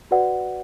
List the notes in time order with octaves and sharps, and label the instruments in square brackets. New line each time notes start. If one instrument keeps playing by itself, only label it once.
[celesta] F#4 B4 D5 F#5